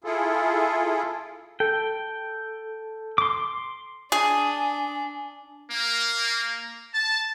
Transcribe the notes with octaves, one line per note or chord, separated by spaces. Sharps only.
E4 F4 G#4 A4
A4 G5
C6 D6
D4 G#4
A#3
A5